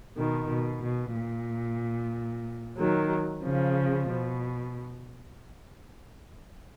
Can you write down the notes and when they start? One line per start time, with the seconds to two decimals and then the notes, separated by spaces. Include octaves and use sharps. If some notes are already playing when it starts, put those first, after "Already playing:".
0.16 B2 D#3
0.49 B2
0.82 B2
1.15 A#2
2.78 D#3 F#3
3.43 C#3 F3
4.09 B2